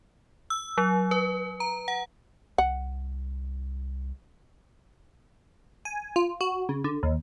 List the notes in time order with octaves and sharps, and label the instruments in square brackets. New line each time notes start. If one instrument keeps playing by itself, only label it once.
[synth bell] E6
F#3
B4
A#5
F#5
[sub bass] C2 [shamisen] F#5
[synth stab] G#5
F4
F#4
C#3
D3
D#2